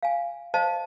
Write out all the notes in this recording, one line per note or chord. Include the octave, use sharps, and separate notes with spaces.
F5 G#5
C5 D#5 F5 A5